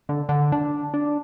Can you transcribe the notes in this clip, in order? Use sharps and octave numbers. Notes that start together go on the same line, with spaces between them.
D3
D3
D4
D4